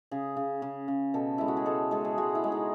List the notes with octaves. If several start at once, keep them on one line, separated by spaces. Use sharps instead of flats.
C#3 G#4
C#3
C#3
C#3
B2 A4
G#3 E4
F#4
G#4
G#3 A4
G#3 A4
G#4
G#3 F#4
E4
G#3
D#4